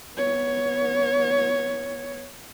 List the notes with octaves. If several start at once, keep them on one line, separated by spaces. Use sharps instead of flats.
B3 C#5